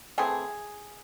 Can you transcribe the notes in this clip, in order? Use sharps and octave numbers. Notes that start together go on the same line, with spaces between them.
E3 A3 C4 G#4